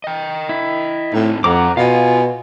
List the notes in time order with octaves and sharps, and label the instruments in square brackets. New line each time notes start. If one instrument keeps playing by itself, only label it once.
[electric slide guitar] D#5 G5
[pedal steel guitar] E4
[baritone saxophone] A2 [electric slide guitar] C4 D#4
[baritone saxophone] F2 [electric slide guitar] A4 C5 [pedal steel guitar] F#5 A#5 D6
[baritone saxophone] B2 [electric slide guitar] F4 [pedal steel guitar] F5 G#5